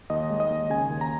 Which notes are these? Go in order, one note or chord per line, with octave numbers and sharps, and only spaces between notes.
D#2 D#5
G#3
D#5
D#2
C#3 G#5
D#2
A#5